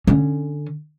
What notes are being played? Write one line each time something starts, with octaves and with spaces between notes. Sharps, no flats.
D3 C#4